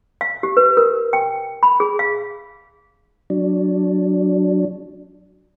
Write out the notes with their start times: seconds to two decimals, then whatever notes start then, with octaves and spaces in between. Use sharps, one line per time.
0.21 F5
0.43 G4
0.57 B4
0.77 A#4
1.13 G5
1.63 B5
1.80 G#4
1.99 F5
3.30 F#3 D4